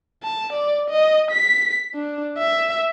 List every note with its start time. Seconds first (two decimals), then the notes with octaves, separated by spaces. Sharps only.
0.23 A5
0.53 D5
0.90 D#5
1.31 B6
1.95 D4
2.38 E5